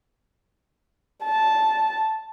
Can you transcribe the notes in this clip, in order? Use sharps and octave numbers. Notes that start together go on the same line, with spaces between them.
A5